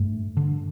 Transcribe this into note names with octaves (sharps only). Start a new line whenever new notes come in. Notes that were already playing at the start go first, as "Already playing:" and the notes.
Already playing: G2 A3
D3